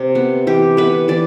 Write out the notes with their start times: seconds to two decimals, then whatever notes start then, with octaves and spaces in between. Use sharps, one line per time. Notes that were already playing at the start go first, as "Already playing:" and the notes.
Already playing: C3
0.15 B3
0.47 E3 G4
0.77 B3 B4
1.08 E3 D5